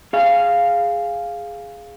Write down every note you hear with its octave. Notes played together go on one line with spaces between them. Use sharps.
G#4 F5